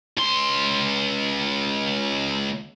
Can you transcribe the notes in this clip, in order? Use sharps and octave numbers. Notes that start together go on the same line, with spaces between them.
C#2 C6